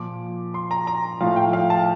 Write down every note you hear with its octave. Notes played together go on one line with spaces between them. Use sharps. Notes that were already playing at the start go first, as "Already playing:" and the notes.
Already playing: A#2 F3 D6
C6
A#5
A#5
A2 F3 F5
G5
F5
A5